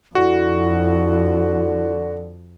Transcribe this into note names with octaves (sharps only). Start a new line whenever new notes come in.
F2 D3 E4 F#4